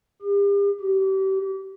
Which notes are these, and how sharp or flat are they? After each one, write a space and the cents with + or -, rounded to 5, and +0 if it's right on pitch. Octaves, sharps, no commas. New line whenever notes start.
G4 +40
G4 -35